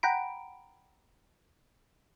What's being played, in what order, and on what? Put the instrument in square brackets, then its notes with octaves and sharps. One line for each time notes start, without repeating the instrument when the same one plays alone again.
[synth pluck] F#5 G5 A#5 B5 D7